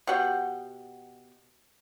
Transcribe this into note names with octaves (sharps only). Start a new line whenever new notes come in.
B2 G4 F#5 G5